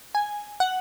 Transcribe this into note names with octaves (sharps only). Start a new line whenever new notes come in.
G#5
F#5